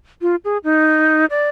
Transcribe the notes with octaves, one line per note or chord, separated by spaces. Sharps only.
F4
G#4
D#4
D5